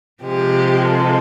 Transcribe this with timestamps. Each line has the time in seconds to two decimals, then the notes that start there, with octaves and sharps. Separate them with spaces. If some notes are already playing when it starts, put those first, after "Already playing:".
0.23 C3 F3 G#3 G4
0.88 A4